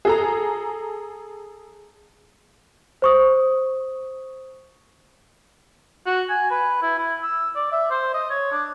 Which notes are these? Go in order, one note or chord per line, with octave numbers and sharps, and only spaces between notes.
G#4 A4 A#5
C5 C#6 D#6
F#4
G#5
B4
E4
E4
E6
D5
E5
C5
D#5
C#5
D4